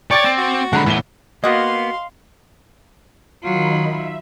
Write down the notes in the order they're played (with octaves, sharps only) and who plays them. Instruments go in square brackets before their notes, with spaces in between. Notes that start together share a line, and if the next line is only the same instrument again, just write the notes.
[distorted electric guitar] C#5 [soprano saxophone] D5 [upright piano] G5 D6 A6
[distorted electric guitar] C4
[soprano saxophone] F#4
[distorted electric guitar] D3 G#3 [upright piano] F#5 A#5 B5
[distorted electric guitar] A2 B3 [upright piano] E3 G7
[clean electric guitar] A#3 B3 [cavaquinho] F#4 F#5 [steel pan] D#5 [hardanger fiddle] F5 C6
[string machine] D#3 D#4 B5 [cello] F#3 F4
[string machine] E5